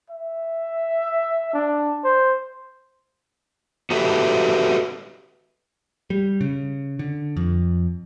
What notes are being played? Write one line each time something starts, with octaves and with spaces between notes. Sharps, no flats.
E5
D4
C5
F#4 G4 A4 B4 E5
G3
C#3
D3
F2